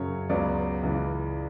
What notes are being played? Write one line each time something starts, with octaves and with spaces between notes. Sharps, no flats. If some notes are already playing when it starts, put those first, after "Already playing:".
Already playing: F#2 C#3 F#3 C#5
C#2 C#3 F#3 B3 D5
C#2 C#3 E3